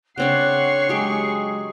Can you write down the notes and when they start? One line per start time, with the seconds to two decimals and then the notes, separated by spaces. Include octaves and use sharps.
0.18 C#3 C4 D4 C#5 F#5 C#6 C7
0.89 F#3 G#3 G4 G#4